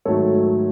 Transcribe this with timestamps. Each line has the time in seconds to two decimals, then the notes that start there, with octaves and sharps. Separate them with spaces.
0.05 G#2 D#3 F#3 A3 A4 C#5